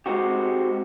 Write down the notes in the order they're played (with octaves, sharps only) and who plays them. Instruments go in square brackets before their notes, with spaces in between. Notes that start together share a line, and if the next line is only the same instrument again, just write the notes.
[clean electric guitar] G#3 C4 D#4 F#4 G4